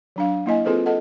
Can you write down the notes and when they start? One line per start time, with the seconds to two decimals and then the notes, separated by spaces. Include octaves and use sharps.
0.16 F#3 D4 F5
0.46 A#3 E4 D#5 G#5
0.65 C4 F4 G#4 A4 B4 C5
0.86 A4 D#5 F#5 A5